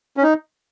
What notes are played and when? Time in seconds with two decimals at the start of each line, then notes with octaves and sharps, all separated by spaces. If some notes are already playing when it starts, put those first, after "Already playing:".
0.17 C#4
0.23 D#4